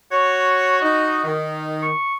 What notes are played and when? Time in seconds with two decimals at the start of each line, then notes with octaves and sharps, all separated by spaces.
0.12 F#4 C#5
0.82 D#4
1.24 D#3
1.82 C#6